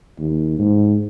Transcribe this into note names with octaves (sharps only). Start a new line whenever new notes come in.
D#2
G#2